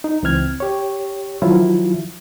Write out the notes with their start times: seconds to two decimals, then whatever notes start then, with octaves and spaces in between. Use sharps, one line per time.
0.04 D#4
0.23 C#2 E3 C4 F6 G#6
0.60 G4 C#5
1.42 D#3 F3 F#3 E4 F4